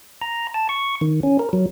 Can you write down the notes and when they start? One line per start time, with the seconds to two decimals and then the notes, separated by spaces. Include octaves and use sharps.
0.22 A#5
0.54 A5
0.69 C#6
1.01 D#3
1.23 C#4
1.39 A#4
1.53 F#3